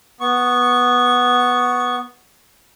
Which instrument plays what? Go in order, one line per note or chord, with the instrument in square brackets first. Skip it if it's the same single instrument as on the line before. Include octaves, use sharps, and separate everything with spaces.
[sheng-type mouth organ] B3 C#6